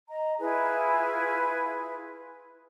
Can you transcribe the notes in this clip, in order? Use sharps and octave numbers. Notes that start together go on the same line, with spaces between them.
D#5 A#5
E4 F4 G#4 B4